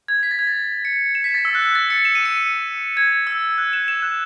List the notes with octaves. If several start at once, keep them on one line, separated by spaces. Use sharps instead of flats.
G#6
B6
A6
G#6
A6
C#7
E7
B6
A6
E6
F#6
F#6
A6
C#7
E7
D#7
C#7
G#6
E6
F#6
E7
E7
F#6